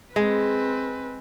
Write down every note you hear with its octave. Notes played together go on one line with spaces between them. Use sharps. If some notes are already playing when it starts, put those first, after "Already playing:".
G#3 C4 B4